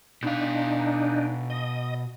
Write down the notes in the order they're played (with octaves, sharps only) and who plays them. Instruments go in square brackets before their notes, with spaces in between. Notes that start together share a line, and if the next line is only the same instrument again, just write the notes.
[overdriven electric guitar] B2 F5 [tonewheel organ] D4 D#4
[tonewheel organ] D#5